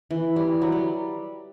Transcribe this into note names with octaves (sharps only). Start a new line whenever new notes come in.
E3
G3
F#3
G3